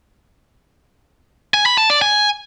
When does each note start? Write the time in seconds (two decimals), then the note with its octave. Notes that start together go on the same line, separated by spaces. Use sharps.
1.54 G#5
1.66 B5
1.78 A5
1.90 D5
2.02 G#5